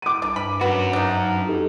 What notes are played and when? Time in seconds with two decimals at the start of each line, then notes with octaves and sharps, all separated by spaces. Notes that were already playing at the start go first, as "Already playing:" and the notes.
0.02 D6 D#7
0.22 C2 D4
0.36 G2 B5
0.61 F#2 B3 F#4
0.93 D4 D#4
1.48 F2 D#4 G4 A4